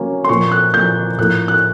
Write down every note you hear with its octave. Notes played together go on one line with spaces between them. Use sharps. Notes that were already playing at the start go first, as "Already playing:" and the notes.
Already playing: F#3 A#3 C#4
C6
A#2 F3 A#3 C#6
F#6
A#2 F3 A#3 G6
A2 F3 A#3 F#6
F#6